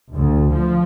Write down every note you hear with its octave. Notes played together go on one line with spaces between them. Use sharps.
D2
F3